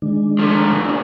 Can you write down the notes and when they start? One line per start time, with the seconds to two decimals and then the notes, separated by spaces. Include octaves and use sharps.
0.02 D#3 G#3 D4
0.39 F3 A3
0.85 A#2 C#3 D4